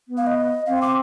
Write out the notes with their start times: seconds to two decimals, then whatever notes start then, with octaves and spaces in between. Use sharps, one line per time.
0.08 B3
0.17 F5
0.27 D#5
0.66 C4 F5
0.82 D6